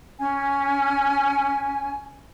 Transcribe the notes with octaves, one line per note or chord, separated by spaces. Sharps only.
C#4 G#5